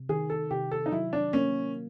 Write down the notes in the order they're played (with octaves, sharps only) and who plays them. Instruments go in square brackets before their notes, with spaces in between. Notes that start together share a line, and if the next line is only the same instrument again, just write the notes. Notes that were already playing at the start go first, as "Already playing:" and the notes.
Already playing: [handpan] C3
[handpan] D#3 [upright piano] G#4
[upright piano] A4
[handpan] C3 [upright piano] G4
[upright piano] A4
D#4
[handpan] F#3 [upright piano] E4
[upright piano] D4
[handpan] A#3 [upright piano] C#4